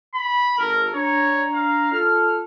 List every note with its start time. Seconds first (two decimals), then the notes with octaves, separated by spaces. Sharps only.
0.14 B5
0.58 G#1 A4 A#4
0.94 D4 C#5 A#5
1.53 F5
1.92 F4 A4 F6